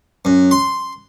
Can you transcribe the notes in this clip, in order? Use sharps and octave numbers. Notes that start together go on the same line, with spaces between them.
F#2
C6